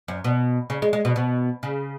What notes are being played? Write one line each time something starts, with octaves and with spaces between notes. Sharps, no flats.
F#2
B2
C#3
G#3
G#3
B2
B2
C#3